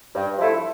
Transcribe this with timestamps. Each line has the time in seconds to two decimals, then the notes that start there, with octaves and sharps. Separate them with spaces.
0.15 G2
0.38 F3 A3 E4